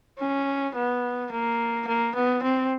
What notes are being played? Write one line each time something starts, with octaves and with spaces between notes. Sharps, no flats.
C#4
B3
A#3
A#3
B3
C4